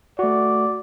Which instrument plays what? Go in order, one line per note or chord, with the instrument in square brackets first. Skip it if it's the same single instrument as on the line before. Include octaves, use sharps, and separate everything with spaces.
[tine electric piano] A3 F#4 [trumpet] D5